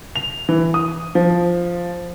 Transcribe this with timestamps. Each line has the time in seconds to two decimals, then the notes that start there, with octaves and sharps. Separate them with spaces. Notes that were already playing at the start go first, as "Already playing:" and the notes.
0.16 F7
0.49 E3
0.74 D#6
1.15 F3